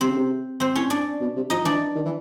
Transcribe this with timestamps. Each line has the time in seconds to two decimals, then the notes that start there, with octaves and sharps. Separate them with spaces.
0.01 C3 C4 C5
0.09 C#3
0.17 C3
0.60 C4 C5
0.75 A2 C#4 C#5
0.90 D4 D5
1.21 B2
1.36 C3
1.50 F3 D#4 D#5
1.65 E3 D4 D5
1.96 D#3
2.05 E3